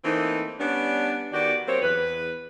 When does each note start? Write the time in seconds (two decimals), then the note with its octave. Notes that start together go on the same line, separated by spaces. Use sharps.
0.04 E3 A3 A#3 C4 D#4
0.59 G3 B3 C#4 D4
1.32 D#3 B3 F#4 G4 D5
1.66 F#3 A#3 C4 G4 C5 C#5
1.81 E2 B4